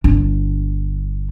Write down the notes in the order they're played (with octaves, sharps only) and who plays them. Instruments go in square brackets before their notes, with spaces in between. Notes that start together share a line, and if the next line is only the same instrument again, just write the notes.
[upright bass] G1 D4